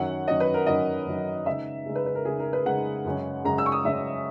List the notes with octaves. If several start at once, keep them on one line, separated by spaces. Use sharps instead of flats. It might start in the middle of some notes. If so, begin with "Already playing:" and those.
Already playing: F#2 D#3 F#3 C#4 F#5
F#2 D#3 F#3 C#4 D#5
B4
A#4
F#2 D#3 F#3 C#4 D#5
F#2 D#3 F#3 C#4
C#3 G#3 D#4 E5
C#3 G#3 D#4
B4
B4
A#4
C#3 G#3 D#4 G#4
A#4
B4
C#3 G#3 D#4 F#5
F#2 C#3 G#3 C#4
F#2 C#3 G#3 C#4 A#5
E6
C#6
D#6
F#2 C#3 G#3 C#4 E5